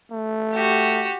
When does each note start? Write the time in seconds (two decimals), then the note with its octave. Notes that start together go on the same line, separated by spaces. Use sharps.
0.11 A3
0.54 F#4 G4